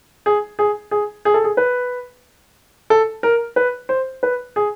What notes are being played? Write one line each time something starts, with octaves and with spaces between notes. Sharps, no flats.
G#4
G#4
G#4
G#4
A4
G#4
B4
A4
A#4
B4
C5
B4
G#4